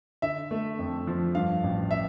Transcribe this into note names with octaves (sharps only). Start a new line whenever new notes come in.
D3 E5
A3
F2
F3
G2 F5
A1
E5